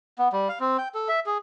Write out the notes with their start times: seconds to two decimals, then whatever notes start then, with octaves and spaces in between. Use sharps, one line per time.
0.19 B3
0.33 G3
0.49 F5
0.60 C4
0.78 G5
0.94 A4
1.08 E5
1.26 G#4